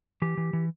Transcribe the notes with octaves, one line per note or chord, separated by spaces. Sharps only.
E3 G4
E3
E3